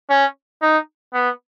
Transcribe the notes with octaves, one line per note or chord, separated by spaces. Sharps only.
C#4
D#4
B3